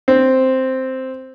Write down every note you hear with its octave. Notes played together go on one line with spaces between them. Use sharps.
C4